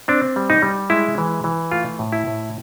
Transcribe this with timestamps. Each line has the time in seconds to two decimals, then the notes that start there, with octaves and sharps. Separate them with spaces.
0.08 C4 D4
0.36 G3
0.50 D#4
0.62 G3
0.90 G#3 E4
1.18 E3
1.44 E3
1.72 A3 F4
1.99 A2
2.12 E4
2.27 A2